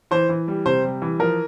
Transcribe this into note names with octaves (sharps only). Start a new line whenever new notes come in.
E3 C5
E3
G3
C3 C5
G3
E3
F3 A#4